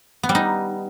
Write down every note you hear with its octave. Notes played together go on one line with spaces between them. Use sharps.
B3
G3
D#4